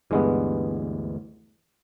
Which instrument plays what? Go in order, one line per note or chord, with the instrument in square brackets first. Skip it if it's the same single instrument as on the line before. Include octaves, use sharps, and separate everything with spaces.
[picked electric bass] D2 E3 [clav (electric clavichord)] G2 G#3 B3